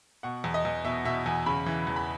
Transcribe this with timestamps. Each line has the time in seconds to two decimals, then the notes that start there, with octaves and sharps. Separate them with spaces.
0.23 B2 F#5
0.44 E2
0.54 D#5
0.65 E2
0.85 B2 E5
1.05 B2 E5
1.26 E2 G#5
1.46 C#3 B5
1.66 E3
1.87 E2
1.96 B5